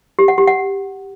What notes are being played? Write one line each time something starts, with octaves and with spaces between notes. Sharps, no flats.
G4
F#5
G4
F#5